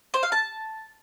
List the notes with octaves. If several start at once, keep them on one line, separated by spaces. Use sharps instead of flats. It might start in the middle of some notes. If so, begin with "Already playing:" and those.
C5
F5
A5